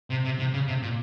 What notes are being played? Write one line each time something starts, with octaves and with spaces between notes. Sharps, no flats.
C3
C3
C3
C#3
C3
A#2